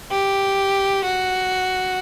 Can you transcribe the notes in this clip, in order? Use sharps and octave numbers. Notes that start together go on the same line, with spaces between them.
G4
F#4